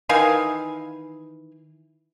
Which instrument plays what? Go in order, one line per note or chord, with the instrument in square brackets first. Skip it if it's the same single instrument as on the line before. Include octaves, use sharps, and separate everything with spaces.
[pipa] D#3 E3 F5 G#5